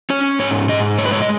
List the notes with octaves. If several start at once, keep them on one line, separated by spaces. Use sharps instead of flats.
C#4 C#5
G#2 C#5
G#2 D#5
G#3 C#5
B4
C#5
D#5